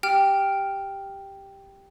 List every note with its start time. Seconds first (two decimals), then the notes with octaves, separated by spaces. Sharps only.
0.03 G4 G5 F6